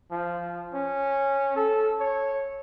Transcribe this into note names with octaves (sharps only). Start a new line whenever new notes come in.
F3
C#4
A4
C#5